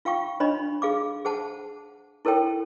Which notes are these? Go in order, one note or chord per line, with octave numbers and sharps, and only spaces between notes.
F4 F5 G5 C#6
D4 C#5 D#5 B5
G#4 F5 D6
G#4 C5 F#5 A5
E4 A4 A#4 C#5 G5